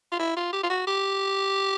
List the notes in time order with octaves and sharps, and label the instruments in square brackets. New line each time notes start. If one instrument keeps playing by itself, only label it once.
[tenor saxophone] F4
E4
F4
G4
F4
F#4
G4